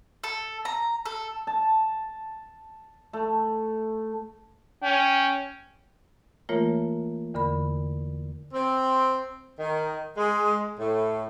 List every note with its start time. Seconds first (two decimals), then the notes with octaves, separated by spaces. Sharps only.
0.24 A4
0.65 A#5
1.06 A4
1.47 A5
3.13 A3
4.83 C#4 G5
6.49 E3 A3 A#3 F4 A#4 C#5
7.34 E2 D3 A#4 B5
8.53 C4
9.59 D#3
10.17 G#3
10.78 A2